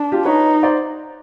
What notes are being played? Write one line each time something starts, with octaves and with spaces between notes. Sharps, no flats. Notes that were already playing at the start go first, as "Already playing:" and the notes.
Already playing: D4
F4 G4
D#4 B4 C#5
C5 D5